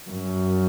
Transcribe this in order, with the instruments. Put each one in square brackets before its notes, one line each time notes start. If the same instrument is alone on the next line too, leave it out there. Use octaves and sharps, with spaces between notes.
[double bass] F#2